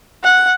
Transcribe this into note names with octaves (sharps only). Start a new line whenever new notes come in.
F#5